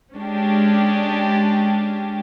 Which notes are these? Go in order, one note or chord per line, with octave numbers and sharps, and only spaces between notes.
G#3 C#4 D4 G4